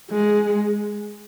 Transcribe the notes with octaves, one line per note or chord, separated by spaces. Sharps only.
G#3